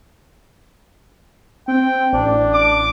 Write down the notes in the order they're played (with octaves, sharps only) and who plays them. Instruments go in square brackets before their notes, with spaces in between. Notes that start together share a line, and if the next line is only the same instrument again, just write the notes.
[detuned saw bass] C4 [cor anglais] G5
[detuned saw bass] A1 [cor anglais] D4
[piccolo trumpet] D6